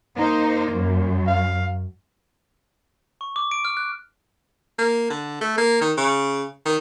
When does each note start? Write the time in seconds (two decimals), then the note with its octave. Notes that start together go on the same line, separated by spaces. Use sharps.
0.17 A#3 D#4 C5
0.72 F#2
1.27 F5
3.21 C#6
3.36 D6
3.51 D7
3.65 F6
3.77 F#6
4.78 A#3
5.10 D3
5.41 A3
5.58 A#3
5.81 D#3
5.97 C#3
6.65 D#3